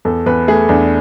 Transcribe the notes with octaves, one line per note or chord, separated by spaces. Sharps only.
E2 A4
E2 B4
A3 G#4
E2 D4